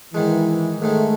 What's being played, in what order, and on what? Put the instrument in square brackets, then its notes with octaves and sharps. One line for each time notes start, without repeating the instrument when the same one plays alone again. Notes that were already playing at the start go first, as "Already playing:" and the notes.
[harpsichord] G#2 D#3 G#3 [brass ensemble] E3
[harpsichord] G#2 D#3 G#3 [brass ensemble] A3